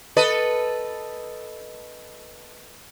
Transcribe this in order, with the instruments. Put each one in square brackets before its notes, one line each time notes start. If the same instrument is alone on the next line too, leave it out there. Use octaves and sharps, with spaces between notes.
[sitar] A4 B4 D#5